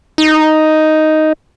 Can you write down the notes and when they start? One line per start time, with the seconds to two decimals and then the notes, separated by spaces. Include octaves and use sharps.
0.18 D#4